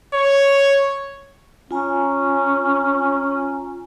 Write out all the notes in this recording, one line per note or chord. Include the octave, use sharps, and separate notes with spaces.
C#5
C#4 F4 G#5 A#5